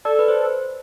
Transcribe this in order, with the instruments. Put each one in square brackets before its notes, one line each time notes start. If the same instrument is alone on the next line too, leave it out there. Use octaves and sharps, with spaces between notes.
[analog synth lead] A4 [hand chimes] D5
[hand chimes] B4
C5